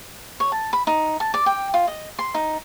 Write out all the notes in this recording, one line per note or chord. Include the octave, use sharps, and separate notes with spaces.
C#5
A5
B5
D#4
A5
D5
G5
F4
D#5
C6
D#4